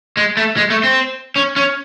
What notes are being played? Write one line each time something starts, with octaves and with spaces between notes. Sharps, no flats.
G#3
A3
G#3
A3
C4
C#4
C#4